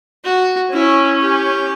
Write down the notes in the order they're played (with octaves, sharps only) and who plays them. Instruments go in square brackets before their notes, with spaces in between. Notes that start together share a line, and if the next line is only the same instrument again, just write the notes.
[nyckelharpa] F#4
[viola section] C#4 [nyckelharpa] E4
[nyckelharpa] G4